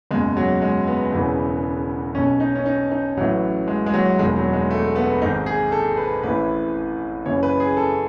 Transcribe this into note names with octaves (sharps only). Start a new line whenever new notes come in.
F#1 E2 B2 G#3
F#3
G#3
B3
E1 E2 C#3 E3
B1 B2 C#4
D#4
C#4
D#4
D#4
A1 A2 E3 F#3
G#3
G#3
F#3
E1 E2 D#3 G#3
F#3
G#3
A3
B3
G#1 G#2 D#3 D#4
G#4
A4
B4
A1 A2 E3 B4
F#1 F#2 E3 C#5
B4
G#4
A4